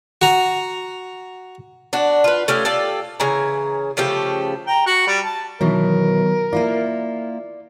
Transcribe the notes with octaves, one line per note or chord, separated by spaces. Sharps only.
F#4 A#5
D4 F#4
F4 B4
A3 C#4 G4 F5
F4 G4 A4 D5
C#3 E3 G#5 A#5
C#3 F3 A3 G4
G5 A#5
F#4 F#5
G3
A5
B2 D#3 E3 F#3 A#4
A#3 E4 F4 D5